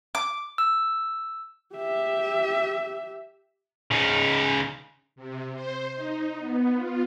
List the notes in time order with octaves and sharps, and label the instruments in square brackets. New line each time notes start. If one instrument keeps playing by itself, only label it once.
[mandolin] D6
[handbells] E6
[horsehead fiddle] G4 E5
[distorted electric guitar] C#3 D#4
[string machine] C3
C5
D#4
B3
F4